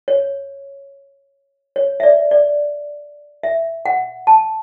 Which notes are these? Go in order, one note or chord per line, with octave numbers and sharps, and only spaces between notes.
C#5
C#5
E5
D5
D5
E5
F#5
A5